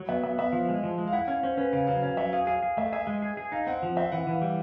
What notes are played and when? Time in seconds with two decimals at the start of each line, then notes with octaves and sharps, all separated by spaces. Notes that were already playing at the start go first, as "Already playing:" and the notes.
Already playing: F#3
0.09 B3 E5
0.24 B3 E5
0.38 B3 E5
0.53 F3 F5
0.69 G#3
0.83 F3
0.98 G#3
1.07 F5
1.13 E4 F#5
1.28 C#4 F5
1.43 C#4 C5
1.57 C#4 B4
1.73 C#3 F5
1.87 F#3 F5
2.02 C#4 F5
2.17 F#3 E5
2.33 G#4 F5
2.47 G#4 F5
2.62 G#4 F5
2.77 A3 E5
2.92 G#4 E5
3.07 G#3
3.22 G#4
3.37 G#4
3.52 D#4 F5
3.67 C4 F#5
3.83 F3
3.97 C4 E5
4.12 E3 F#5
4.27 E3 F5
4.42 G3